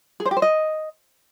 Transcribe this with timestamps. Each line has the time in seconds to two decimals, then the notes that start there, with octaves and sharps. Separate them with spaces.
0.20 G#4
0.25 C5
0.31 G4
0.37 C5
0.42 D#5